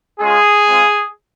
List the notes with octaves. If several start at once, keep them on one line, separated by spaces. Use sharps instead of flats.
G#3 C#4 F4 G#4
G#3 C4 F4